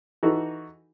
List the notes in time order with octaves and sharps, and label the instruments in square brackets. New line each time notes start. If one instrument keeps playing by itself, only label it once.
[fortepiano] E3 D#4 F#4 A4